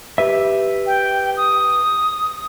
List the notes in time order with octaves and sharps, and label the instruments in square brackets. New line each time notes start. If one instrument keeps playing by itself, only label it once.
[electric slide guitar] G4 B4 E5
[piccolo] G5
D#6